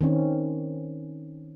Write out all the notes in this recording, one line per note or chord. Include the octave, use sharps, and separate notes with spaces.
D#3 C4 C#4